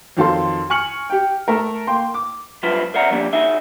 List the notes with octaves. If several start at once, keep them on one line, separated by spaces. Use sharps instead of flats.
F2 D#3 F#3 A4 F5 C6
G#5 C#6 F6 C#7 F#7
G4 G5
A3 A4 A#4
A#3 G5 C6
D6
G2 F#3 E4 F4 B4 C5
A#4 C5 D5 E5 F#5 A#5
F3 G3 A#3 D4
D#4 F#4 G#4 E5